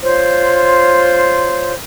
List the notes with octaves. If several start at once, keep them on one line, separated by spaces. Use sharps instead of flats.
F4 C5 C#5